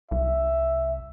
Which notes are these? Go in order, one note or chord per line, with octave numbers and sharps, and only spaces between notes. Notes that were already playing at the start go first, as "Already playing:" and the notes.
C2 E5